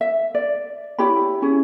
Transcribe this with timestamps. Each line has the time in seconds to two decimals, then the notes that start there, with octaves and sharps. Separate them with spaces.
0.01 E5
0.35 D5
0.98 E4 G4 C#5 B5
1.42 C#4 E4 G#4